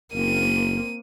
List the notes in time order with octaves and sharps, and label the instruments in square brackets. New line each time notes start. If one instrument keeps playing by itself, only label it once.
[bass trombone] F#1 [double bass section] A#3 C4 [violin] D#7